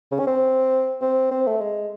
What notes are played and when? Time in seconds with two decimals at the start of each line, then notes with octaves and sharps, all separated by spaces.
0.12 C#3
0.19 C#4
0.27 C4
1.02 C4
1.31 C4
1.47 A3
1.61 G#3